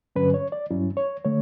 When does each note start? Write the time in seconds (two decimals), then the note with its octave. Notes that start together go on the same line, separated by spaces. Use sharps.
0.16 G2 D3 F#3 C#4 B4
0.34 C#5
0.52 D5
0.70 G2 F#3 C#4 E4
0.97 C#5
1.25 D3 A3 C#5